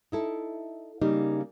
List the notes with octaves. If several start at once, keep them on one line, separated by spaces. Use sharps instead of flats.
D#4 E4 A4
C#3 G3 A#3 D#4